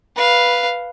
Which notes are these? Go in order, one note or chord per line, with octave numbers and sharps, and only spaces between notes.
B4 F5